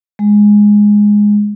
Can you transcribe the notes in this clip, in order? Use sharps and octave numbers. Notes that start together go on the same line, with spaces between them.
G#3